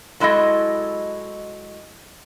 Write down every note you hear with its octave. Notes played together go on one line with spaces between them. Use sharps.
F#3 G#3 E4 A4 D#5